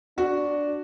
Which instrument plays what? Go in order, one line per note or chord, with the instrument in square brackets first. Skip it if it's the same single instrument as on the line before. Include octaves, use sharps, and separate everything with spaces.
[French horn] D4 [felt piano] F#4